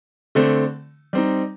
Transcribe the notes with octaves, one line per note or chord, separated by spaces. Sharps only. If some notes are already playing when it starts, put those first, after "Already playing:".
D3 A3 C4
G3 C4 D#4